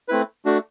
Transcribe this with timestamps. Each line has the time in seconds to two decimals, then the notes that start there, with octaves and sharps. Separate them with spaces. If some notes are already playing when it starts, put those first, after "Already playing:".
0.09 A3 C4 E4 B4
0.45 A3 D4 F#4